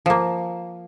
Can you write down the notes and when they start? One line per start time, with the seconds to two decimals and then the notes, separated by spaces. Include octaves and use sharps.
0.06 F3 A#3